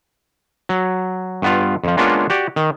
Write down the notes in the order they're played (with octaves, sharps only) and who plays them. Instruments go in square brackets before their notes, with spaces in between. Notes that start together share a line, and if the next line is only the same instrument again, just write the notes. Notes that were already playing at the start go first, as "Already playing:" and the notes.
[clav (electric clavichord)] F#3
G2 B3 F4
F2 F3
G#3 A#3 B3 C#4 D4 F4
F#4 G4 D5
D#3